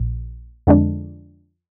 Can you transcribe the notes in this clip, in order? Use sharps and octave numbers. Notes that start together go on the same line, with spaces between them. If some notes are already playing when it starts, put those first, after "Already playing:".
Already playing: A#1
F2 D3 G#3 D4